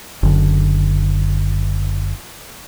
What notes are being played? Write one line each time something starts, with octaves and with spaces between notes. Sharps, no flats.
F#1 D3